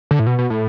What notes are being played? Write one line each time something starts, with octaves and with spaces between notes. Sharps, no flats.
D3
A2
B2
B2
A2